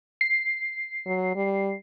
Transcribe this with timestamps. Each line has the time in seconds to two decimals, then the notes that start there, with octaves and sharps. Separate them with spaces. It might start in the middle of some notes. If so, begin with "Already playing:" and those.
0.21 C7
1.06 F#3
1.36 G3